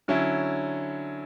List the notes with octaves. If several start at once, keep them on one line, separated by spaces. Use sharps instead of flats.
D3 F#3 C#4 E4